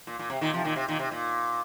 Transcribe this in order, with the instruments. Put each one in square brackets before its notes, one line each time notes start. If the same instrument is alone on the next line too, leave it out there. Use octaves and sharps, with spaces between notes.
[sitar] A#2
A#2
C3
A#2 D#3
C3 F3
A#2 D#3
C3
A#2 D#3
C3
A#2